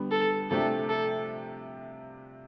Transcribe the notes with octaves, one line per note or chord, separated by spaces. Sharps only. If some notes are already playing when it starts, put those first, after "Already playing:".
Already playing: D3 G3 B3
A4
C3 F3 A3 D4 G4 A4
A4